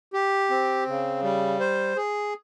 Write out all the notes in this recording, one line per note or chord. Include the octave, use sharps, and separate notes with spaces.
G4
C4
C#3
G3
C5
G#4